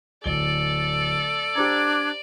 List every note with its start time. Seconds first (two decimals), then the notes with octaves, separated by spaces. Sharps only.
0.24 D1 A4 D5 G7
1.56 D4 G4 C5 A#5 D6 G#6